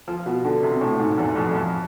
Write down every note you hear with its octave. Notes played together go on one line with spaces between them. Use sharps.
F3
B2
D3
C3
A2
G#2
E2
F2
F2